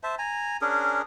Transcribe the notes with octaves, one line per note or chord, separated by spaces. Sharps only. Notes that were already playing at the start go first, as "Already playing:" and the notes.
C5 E5 A5
G#5 A#5
C#4 D4 G#4 A#4